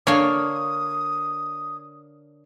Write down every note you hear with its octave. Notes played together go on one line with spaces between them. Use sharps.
D3 A#3 D4 C#5 F5 D#6